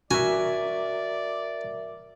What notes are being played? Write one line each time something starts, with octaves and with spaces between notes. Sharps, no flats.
F#4 A#4 D5 E5 G#5